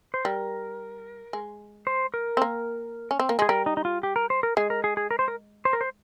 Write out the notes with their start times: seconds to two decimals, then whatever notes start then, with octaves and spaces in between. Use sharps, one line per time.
0.14 C5
0.25 G3 A#4
1.33 G#3
1.87 C5
2.14 A#4
2.37 C4
2.42 A#3
3.11 C#4
3.19 C4
3.29 A#3
3.39 G#3 G#4
3.49 G3 A#4
3.66 D#4
3.77 D#4
3.85 F4
4.03 G4
4.16 A#4
4.30 C5
4.43 A#4
4.57 G#3 G#4
4.70 A#4
4.84 G#4
4.97 G#4
5.11 A#4
5.19 C5
5.28 A#4
5.65 C5
5.73 A#4
5.81 C5